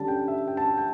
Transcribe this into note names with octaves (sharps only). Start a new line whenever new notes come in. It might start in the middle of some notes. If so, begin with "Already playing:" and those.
Already playing: D3 G3 C#4 A5
G5
E5
G5
A5
G5
G5